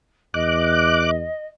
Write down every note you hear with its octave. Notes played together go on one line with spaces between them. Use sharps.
E2 D#5 D6 F#6